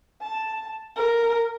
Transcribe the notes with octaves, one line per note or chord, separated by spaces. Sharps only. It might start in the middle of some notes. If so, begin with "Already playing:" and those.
A5
A#4